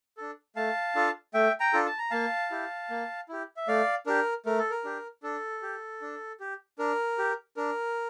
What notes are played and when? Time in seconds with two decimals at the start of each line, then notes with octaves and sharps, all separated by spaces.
0.17 D4 A4
0.56 A3 F5 A5
0.95 D4 F4 A4
1.34 A3 E5 G5
1.60 G5 A#5
1.73 D4 F4 A4
1.86 A5
1.98 A#5
2.11 A#3 F5 A5
2.51 E4 G4
2.90 A#3
3.29 E4 G4
3.57 E5
3.68 A3 D5 F5
4.06 D4 G4 A#4
4.46 A3 A#4
4.58 A4
4.71 A#4
4.84 D4 G4
5.23 D4 A4
5.62 G4
6.01 D4
6.40 G4
6.79 D4 A#4
7.18 G4
7.57 D4 A#4